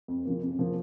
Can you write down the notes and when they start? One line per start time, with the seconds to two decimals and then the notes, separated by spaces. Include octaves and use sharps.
0.08 F2
0.25 C#3 F3 A#3
0.41 F2
0.59 C#3 F3 A#3